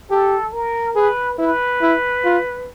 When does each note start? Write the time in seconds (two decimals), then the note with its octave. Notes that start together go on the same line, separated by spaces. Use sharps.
0.10 G4 A4
0.53 A#4
0.96 G#4 B4
1.38 E4 B4
1.82 E4
2.25 F4